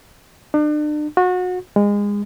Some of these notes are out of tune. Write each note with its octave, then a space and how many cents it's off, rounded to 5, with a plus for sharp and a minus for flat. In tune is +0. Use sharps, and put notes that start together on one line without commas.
D4 +40
F#4 -30
G#3 -25